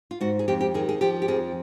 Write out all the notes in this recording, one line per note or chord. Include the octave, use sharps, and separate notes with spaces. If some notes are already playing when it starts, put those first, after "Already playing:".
F4
G#2 F#4
G#4
F2 G4
G4
D#3 G#4
G#4
F3 G4
G4
F2 G#4